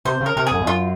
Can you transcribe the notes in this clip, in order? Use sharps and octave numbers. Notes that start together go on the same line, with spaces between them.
C3 C5
C#3
A#4
C3 A#4
F#2 G#4
F2
F#2 F4